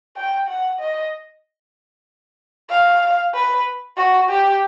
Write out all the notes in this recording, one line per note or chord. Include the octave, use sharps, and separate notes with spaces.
G5
F#5
D#5
F5
B4
F#4
G4